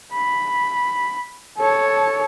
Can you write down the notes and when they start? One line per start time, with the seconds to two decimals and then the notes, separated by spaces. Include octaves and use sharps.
0.13 B5
1.58 A4 C#5